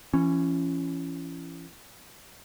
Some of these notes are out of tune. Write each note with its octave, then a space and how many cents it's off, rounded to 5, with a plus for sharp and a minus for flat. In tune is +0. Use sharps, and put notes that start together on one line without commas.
E3 +35 C#4 +0